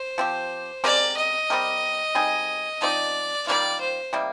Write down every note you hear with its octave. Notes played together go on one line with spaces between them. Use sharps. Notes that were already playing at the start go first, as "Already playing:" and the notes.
Already playing: C5
F3 C4 G4
G#3 C4 G4 A#4 D5
D#5
G3 C4 G4 A#4
G3 C4 D#4 G#4
F3 C4 D#4 D5
D#3 G3 A#3 F4 D5
C5
C3 D#3 G3 A#3